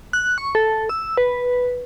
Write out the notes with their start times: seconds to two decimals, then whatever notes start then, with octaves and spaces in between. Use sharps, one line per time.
0.13 F#6
0.38 C#6
0.55 A4
0.89 E6
1.18 B4